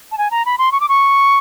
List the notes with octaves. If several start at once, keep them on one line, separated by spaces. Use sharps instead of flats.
A5
G#5
A#5
B5
C6
C#6
D6
C#6